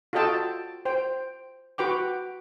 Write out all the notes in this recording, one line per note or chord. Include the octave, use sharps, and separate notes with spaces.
F4 F#4 A4 D#5 G5 A5
C5 G5
F#4 B4 G5 D6